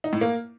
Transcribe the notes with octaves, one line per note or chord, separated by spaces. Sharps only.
D#4
A2
A#3